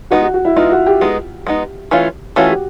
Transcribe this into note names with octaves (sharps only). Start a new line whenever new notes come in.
G#3 B3 D#4 F#4
F#4
F#4
E4
G#3 B3 D#4 F4
F#4
G4
G#3 B3 D#4
G#3 B3 D#4
E3 A3 C#4 F4
E3 A3 C#4 F4 F#4
G4